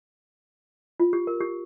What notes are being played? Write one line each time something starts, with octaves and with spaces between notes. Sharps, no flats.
F4
G4
A#4
G4